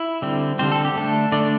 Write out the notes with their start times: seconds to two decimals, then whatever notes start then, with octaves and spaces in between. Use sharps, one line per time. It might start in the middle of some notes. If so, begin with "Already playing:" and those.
Already playing: E4
0.22 D3 G3 C4
0.59 D3 G3 C4 C5
0.72 A4
0.85 G4
0.96 D3 A3 D4 A4
1.32 D3 A3 D4 D5